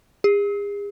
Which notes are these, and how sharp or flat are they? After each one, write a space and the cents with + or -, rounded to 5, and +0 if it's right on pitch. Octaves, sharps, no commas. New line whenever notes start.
G#4 -40